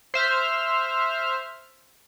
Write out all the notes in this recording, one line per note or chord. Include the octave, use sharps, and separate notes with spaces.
C5 E5 F6